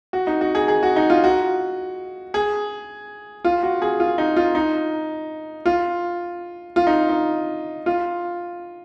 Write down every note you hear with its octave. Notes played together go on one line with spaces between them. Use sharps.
F#4
D#4
F#4
G#4
G#4
F#4
D#4
F4
F#4
G#4
F4
F#4
G#4
F4
D#4
F4
D#4
F4
F4
D#4
D#4
F4